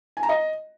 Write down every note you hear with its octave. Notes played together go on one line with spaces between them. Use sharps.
G#5
A#5
D#5